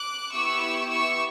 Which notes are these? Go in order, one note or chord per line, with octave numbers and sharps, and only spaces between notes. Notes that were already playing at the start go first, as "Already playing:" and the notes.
Already playing: D6 F#6
B3 E4 G4 C#6 E6
C#6 E6